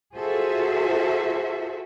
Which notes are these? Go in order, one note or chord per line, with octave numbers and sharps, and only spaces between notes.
F4 F#4 G#4 A4 C5 E5